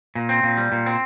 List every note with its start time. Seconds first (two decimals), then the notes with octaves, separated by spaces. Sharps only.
0.15 A#2
0.29 C4
0.43 A#2
0.57 G3
0.72 A#2
0.86 C4